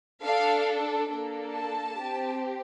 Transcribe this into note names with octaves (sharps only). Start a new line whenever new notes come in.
D4 A4 F5
A#3 D4 A4
A5
C4 G4